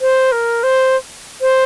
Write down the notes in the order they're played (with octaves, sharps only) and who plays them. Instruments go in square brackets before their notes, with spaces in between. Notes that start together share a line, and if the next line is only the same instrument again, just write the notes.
[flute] C5
A#4
C5
C5